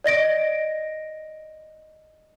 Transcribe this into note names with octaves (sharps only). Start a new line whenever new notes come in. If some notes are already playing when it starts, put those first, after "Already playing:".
D5 D#5 A#6 D7